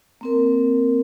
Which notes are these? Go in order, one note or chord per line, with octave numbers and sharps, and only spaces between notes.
A#3 C4 A#4